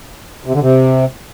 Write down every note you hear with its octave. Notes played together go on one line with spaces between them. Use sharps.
C3
D3
C3